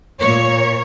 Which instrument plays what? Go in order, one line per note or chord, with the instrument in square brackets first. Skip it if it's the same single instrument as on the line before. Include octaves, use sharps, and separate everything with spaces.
[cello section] A#2 C#5